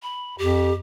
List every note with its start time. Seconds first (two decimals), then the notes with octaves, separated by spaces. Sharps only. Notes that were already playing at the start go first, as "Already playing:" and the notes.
0.03 B5
0.38 F2 G4